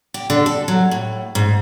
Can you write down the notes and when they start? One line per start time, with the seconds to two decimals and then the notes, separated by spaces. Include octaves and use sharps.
0.14 G4
0.30 D3
0.46 A4
0.68 F#3
0.91 A2
1.35 G#2